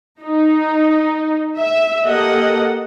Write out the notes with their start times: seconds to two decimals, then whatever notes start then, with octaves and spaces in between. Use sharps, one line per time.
0.21 D#4
1.57 E5
2.04 A#3 G4 A4 D#5 F#5